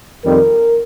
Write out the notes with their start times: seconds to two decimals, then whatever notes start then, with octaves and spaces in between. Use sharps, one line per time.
0.23 F2 D#3 G3 C4 A#4